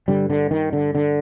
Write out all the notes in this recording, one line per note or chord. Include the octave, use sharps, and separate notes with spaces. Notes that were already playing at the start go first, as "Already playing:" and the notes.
G2 D3 G3
D3
D#3
D3
D3